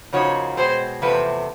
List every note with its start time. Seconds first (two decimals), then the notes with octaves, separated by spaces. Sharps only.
0.13 C#3 F3 A#3 D#4 F#4 C#5
0.57 B2 G#3 C4 C5
1.02 E2 C3 F3 A3 B4